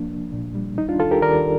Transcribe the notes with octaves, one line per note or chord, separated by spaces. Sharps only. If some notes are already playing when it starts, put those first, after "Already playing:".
Already playing: F3 A#3 D4
C2
A#2
G3
D#2 D#4
D4 F4
D#2 F4 A4
G4 A#4
D#3 A#4 D5